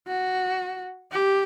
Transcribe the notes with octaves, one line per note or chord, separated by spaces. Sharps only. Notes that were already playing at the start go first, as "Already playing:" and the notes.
F#4
G4